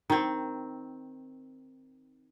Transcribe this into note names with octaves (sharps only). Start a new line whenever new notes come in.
D#3 C4